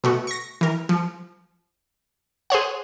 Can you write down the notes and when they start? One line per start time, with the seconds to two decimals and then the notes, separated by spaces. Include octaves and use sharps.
0.04 B2 A3 F#4
0.27 C#6 A#6
0.61 E3 A#4
0.89 F3
2.50 G#4 C5 C#5 F#5